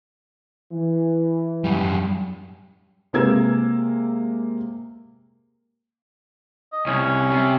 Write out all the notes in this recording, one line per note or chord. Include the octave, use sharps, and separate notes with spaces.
E3
F#2 G3
C3 G#3 A#3 E6 G#6
D#5
C2 C#4
C3